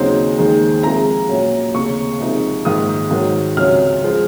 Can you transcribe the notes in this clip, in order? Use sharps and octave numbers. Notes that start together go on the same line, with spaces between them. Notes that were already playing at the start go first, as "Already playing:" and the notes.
Already playing: D#2 C#3 F#3 C4 D#4 C5
D#2 D#3 G#3 D#4
C2 C3 F3 G#3 A#5
A#1 A#2 F#3 C#4
F1 D#2 C#3 C#6
C2 C3 F3 G#3 D#4
A#1 G#2 D#3 D#6
G#2 D#3 F#3
C#2 C3 F#3 C#4 F6
F3 G#3